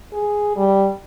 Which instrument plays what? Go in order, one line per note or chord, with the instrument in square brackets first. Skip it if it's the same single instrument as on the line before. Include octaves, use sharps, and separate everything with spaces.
[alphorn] G#4
G3